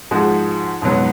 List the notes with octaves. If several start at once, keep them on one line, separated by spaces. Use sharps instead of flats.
G#2 F3 G#3 F#4
F2 G#2 B2 F#3 B3